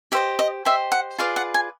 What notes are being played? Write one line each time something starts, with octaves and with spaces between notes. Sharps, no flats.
G4 C5 D#5 E5
D#5
G4 C5 D#5 E5
F#5
F4 G#4 B4 D5 F5
F#5
G#5